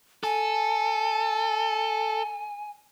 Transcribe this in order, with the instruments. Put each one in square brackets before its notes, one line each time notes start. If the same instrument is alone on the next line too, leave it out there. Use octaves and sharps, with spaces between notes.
[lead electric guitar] A4 [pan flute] G#5